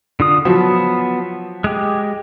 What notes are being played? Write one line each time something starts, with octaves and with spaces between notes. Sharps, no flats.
D3 F4 D#6
F3 F#3 B3 F#4 A5
G#3 G4